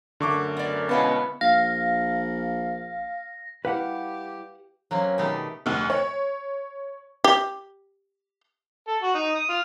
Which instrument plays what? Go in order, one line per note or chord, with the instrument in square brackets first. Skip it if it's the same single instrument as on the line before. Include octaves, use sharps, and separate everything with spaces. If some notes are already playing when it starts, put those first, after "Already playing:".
[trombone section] F#2 A3 A#4 [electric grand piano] D3 C#6 D6
[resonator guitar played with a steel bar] B3 D5
[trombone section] B2 G#3 C#4 [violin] B3 [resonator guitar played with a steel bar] E4 F5 A5
[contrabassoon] A#1 [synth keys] F5 [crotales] A#6
[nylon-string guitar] G3 E4 [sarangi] G4 [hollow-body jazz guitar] B4 F5 F#5
[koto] F#3 A#3 C4 C#4
B2 D#3 A3 G4 D5
[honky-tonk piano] F1 D2 F6
C#5
[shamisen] G4
[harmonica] A4
F#4
D#4
D#6
F4